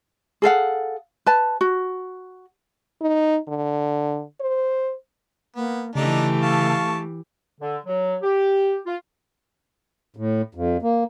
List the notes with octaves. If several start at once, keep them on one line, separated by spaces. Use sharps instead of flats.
G#4 A4 F5 F#5
B4 A5
F#4
D#4
D3
C5
A#3 B3
C#3 E3 A3 D4 D#4 G4 D5
F5 A5 C#6
D3
F#3
G4
F4
A2
F2
A#3